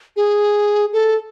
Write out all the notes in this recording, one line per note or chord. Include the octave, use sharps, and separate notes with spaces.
G#4
A4